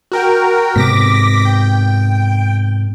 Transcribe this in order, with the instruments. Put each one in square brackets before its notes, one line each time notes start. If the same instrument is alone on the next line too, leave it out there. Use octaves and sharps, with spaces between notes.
[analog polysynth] F#4 A#4 G5
[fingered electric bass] G#2 C3 B3 [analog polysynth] D6 A#6 B6
[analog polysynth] G5